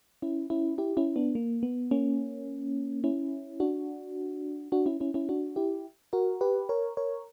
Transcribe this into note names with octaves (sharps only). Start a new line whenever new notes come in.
C#4 E4
C#4 E4
E4 G4
C#4 E4
B3 D4
A#3
B3
A#3 C#4
C#4 E4
D4 F#4
D4 F#4
C#4 E4
C#4 E4
C#4 E4
D4 F#4
E4 G4
F#4 A#4
G4 B4
A#4 C#5
A#4 C#5